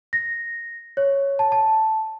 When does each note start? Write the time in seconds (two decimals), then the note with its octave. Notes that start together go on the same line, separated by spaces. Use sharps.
0.13 A#6
0.97 C#5
1.39 A5
1.52 A5